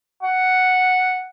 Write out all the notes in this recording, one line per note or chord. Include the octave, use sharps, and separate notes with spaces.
F#5